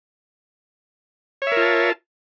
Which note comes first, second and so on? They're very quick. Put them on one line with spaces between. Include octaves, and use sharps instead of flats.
C#5 E5 A#4 F4 A5